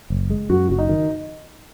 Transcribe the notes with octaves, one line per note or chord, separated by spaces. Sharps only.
F#1
G#3
F#2 F#4
F#1 F#4
D#4
D#3